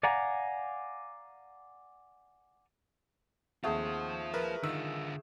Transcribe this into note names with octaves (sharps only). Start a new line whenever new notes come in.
D5 F5 F#5 G#5 A#5
D#2 A3 C4 F4 G#4 C5 F#5
A#4 B4
D3 D#3 F4 E6